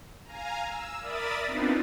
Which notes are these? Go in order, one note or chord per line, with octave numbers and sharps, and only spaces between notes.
F5 G#5 A#5
E6
A#4 D5 E5 B5 D#6 A6
B3 C4 D4 D#4 F4 B4